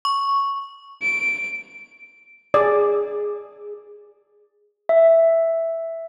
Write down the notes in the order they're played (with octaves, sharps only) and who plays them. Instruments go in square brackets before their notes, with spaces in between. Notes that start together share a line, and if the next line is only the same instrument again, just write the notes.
[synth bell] C#6
[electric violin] D7
[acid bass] G#4 [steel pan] D5
[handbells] E5